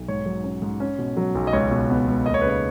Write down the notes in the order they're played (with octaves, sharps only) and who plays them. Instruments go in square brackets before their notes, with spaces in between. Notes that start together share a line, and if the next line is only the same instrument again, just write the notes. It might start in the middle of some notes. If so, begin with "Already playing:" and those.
Already playing: [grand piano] B1
G#2 C#5
F#3
C#4
G#2
C#4
B2
F#3
B1
D#5
C#2 C#5
B2
B3
C#2
D#2 D#5
C#5
C#3 B4
C#5